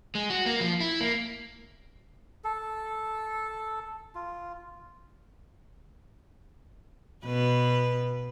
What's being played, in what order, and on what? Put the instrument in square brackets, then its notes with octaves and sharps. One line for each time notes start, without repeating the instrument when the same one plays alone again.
[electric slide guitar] G#3
F#4
A#3
F3
E4
A#3
[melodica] A4
F4
[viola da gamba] B2 B4